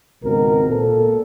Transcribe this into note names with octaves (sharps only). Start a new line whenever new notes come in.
G#1 C#2 B2 C4 A#4
A#2 A4